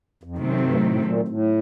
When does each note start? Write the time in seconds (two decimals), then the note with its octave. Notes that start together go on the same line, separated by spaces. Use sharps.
0.23 F2
0.38 F#2 C3 D#3 F#3 A3 C4
0.61 G2
0.74 G#2
0.82 A2
1.05 A#2
1.28 A2